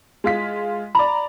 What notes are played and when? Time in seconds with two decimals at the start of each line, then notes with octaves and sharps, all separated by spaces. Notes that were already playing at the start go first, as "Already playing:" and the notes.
0.24 G#3 F4 B6
0.95 D5 A#5 B5